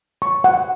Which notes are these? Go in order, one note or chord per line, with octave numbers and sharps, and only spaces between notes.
C#6
F#5